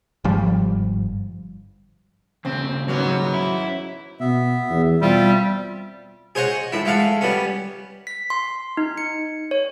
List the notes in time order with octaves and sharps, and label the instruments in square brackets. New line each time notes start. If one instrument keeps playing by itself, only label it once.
[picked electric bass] G1 G#2 F3 G3
[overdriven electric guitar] D#2 C#3 [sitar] C4
[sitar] G#2 B3 C#4 [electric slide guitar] F#3
[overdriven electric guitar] E4
[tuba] B2 [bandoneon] B3 E5
[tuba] E2
[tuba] B2 [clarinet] G3 [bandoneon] C4 F4 E5
[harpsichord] G#4 C5 C#5 D#5 F#5
A2 E4
G#3 A3 F5 F#5
G3 B3 C#4
[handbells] B6
C6
D#4
C#7
C#5